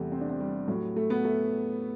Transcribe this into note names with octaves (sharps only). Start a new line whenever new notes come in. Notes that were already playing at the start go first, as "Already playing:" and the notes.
Already playing: E2 C3 G3 A3
C4
D4
C4
G3
A2 F#3
A3
B3
A3